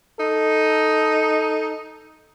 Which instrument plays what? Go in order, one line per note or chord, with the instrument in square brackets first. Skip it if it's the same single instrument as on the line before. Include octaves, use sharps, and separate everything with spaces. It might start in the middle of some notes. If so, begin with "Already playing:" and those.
[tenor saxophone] D#4 [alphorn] A4